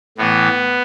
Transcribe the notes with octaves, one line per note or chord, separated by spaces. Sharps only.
A2 E3 B3